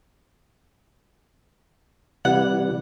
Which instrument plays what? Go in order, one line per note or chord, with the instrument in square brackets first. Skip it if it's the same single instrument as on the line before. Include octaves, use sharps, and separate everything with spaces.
[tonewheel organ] C3 E3 G3 [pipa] F#5